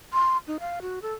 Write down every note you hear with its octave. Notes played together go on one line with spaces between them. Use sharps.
C6
D#4
F5
F#4
A4